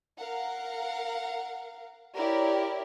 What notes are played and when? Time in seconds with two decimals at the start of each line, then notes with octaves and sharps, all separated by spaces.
0.19 A#4 F5 F#5
2.16 E4 G4 A#4 C#5 D5